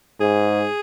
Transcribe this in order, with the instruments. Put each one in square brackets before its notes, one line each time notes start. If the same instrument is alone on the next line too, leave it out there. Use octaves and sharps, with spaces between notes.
[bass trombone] G#2 [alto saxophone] G#4